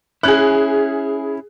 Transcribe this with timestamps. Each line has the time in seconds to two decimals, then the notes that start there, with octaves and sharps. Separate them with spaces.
0.23 C#4 E4 G#4 F#6